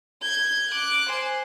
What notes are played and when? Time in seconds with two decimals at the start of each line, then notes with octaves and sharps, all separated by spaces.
0.22 G6 G#6
0.71 D6 F#6
1.10 C5 G#5